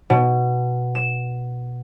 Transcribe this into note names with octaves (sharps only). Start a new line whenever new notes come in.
B2
E7